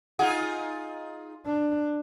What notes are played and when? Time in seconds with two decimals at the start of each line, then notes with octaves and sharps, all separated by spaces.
0.19 D#4 F4 G#4 F#5
1.46 D4